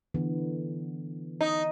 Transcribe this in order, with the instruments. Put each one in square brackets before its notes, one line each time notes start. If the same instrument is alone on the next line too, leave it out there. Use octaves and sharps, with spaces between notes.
[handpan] D3 E3 B3
[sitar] D#4